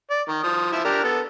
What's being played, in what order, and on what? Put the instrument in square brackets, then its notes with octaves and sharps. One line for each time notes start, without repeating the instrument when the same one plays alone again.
[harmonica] D5
D#3
F3 D#6
F3 E4 E5
D4 G4 A#4
B3 A4